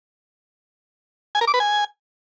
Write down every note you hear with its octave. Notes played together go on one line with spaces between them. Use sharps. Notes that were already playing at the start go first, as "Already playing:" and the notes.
G#5
A#4
D6
B4
G#5